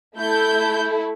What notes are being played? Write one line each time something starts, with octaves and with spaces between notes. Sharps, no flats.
A3 E4 A4 G6